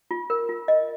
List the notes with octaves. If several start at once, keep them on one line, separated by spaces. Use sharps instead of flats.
F4
A#4
F4
D#5